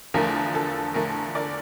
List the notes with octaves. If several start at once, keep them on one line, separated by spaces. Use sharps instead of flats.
E2 D3 F3 A3 A#4
A4
E2 D3 F3 A3 A#4
A#4 D5